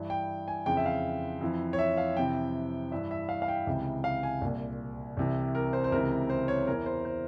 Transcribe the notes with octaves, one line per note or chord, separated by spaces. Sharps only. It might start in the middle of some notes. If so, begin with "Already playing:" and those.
Already playing: G2 E3
G5
G#5
F2 C#3 E3 G5
E5
F5
F2 E3
C#5
E5
F5
F2 C3 E3 G5
G2 E3 E5
E5
F5
F5
G5
C#2 C3 E3
F5
G#5
C2 A#2
C2 C3 E3
A#4
C5
C5
C#2 C3 E3 A#4
C5
C#5
E2 E3 A#4
C5
C5